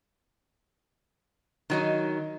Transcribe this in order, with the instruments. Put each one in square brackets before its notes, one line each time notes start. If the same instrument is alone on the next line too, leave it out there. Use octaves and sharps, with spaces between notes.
[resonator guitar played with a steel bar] D#3 F#3 D#4